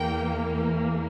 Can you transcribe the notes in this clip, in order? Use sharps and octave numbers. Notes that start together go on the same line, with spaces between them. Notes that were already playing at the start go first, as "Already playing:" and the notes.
Already playing: E2 E3 A#3 G5